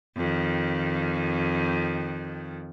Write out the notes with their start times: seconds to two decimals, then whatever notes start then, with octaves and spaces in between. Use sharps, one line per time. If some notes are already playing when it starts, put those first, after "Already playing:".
0.16 F2 D#3